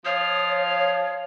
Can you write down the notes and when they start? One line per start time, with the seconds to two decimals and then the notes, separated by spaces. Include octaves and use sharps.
0.05 F3 C#5 D#5 F5